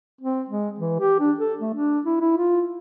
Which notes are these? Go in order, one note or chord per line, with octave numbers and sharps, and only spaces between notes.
C4
G#3
E3
G4
D4
A4
A3
D4
E4
E4
F4